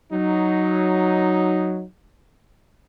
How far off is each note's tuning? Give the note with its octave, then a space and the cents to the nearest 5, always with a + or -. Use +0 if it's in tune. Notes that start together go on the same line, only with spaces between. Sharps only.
F#3 +0 D#4 +0